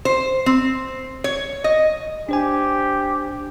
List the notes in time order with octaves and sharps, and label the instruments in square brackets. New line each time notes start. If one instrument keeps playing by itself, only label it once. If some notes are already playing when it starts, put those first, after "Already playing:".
[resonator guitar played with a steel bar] C5
C4
C#5
D#5
[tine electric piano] D4 C5 G#5 [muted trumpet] G4